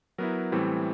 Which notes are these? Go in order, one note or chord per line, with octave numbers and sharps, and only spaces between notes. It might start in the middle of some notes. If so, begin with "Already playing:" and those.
F#3 B3 E4 A#4
A2 E3 G3 C4